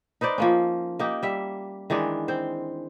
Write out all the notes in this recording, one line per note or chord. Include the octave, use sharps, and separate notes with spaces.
D#4 B4 C5 D5
F3 A#3 C#4
A#3 D#4 G4
G3 E5
D#3 E3 G#3 D4
C4 C5